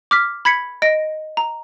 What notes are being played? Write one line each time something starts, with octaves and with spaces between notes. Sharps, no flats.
D6 F6 B6
B5 G#6 B6 C#7
D#5 A#6 D7
A#5